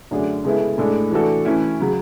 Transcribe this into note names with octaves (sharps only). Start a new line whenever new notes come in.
F#2 D3 A3 D4 G#4
C#3 G#3 B3 E4 A4
A2 G#3 D4 A4
E3 A3 D4 F#4 A4
E3 A3 C#4 E4
C#3 F#3